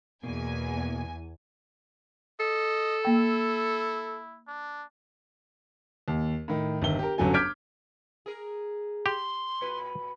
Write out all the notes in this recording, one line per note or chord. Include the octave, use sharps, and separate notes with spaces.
E2 B2 A#3 G#5
A4 D#5
A#3 E4 G5
D4
D#2
A2 D#3
G1 D#3 E5 G7
G4 A#4
G1 F#2 F#3 A4 G#5
D6 F6 G6 G#6 B6 D7
G#4 A#4
G4 C6
A2 F#4 B4